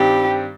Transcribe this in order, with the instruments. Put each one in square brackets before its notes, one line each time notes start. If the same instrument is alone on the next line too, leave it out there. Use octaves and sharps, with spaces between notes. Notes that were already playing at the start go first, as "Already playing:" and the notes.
Already playing: [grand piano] G2 D#3 G3 C4 [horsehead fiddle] G4